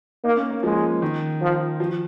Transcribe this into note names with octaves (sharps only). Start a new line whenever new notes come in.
A#3 D#4
C#4
A#3
F3 G#3
D#3
F3
F3